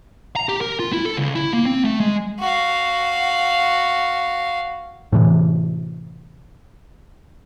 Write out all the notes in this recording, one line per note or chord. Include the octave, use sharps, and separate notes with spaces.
A#5
G4
A#4
F4
E4
A4
C#2
E4
A#3
C4
A3
G#3
F#4 F5
A2 C3 E3